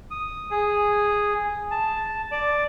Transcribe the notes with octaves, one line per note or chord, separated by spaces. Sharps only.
D#6
G#4
A5
D5